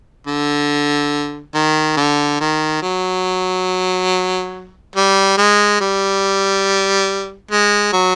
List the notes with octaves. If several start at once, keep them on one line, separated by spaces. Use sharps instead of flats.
D3
D#3
D3
D#3
F#3
G3
G#3
G3
G#3
F#3